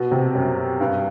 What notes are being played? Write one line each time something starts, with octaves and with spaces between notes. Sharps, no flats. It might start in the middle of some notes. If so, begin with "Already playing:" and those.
Already playing: B2
C3
F#2
G2